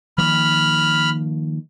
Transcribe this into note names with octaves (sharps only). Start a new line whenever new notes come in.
D#3 F3 A#3 B5 F6